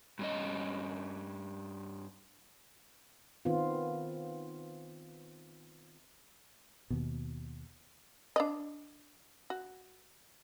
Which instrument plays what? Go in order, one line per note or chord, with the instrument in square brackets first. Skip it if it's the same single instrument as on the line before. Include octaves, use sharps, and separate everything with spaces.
[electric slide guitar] G2 C#4 D#5
[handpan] D#3 B3 C4 F4
[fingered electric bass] D#2 B2
[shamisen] D4 D5 D#5
F#4